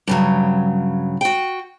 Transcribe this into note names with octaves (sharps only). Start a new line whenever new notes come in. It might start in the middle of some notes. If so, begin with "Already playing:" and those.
G2 C#3 F#3
F#4 G5